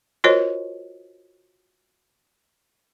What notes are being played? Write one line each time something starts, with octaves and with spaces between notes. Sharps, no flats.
F4 F#4 A#4 C5 C#5 D#5